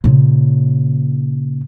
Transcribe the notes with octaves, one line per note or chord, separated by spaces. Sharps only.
A#2 C#3